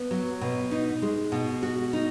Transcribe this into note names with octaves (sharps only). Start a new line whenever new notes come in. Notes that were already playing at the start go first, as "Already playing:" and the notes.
Already playing: B3
F#3
B2
D#4
G#3
B2
F#4
D#4